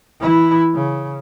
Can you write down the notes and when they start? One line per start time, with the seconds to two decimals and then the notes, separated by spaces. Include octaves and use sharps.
0.20 E3 E4
0.74 C#3